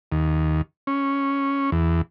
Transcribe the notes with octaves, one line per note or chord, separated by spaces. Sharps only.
D#2
C#4
E2